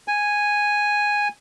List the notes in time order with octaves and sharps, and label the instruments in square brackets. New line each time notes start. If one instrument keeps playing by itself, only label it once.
[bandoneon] G#5